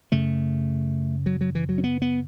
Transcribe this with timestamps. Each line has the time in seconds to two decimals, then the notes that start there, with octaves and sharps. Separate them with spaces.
0.12 F#2 C#3 A3
1.26 F#3
1.41 F#3
1.55 E3
1.69 F#3
1.78 C#4
1.84 B3
2.02 B3